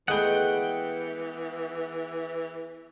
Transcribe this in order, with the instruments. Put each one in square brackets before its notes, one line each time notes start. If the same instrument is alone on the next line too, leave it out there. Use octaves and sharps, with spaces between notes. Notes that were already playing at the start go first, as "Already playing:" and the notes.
[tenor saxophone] E3 [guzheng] G#3 A3 B3 [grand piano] G#4 [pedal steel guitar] F#5 G5